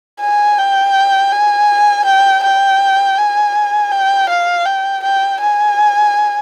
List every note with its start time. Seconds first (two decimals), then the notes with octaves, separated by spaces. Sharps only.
0.20 G#5
0.58 G5
1.32 G#5
2.05 G5
2.44 G5
3.18 G#5
3.92 G5
4.29 F5
4.66 G5
5.04 G5
5.41 G#5